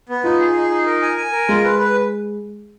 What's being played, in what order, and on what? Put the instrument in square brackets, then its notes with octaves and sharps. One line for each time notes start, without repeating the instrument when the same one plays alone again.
[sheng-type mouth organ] B3
[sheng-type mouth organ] D#4 [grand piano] F4
[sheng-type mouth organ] G#4
D#4
D#4
A#4
G#5
G#5
A#4
[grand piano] G#3 [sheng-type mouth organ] F4
[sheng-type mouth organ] B4
B4